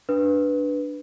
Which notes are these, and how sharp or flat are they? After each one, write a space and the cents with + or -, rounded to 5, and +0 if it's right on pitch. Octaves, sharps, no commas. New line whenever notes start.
D4 +0 B4 +0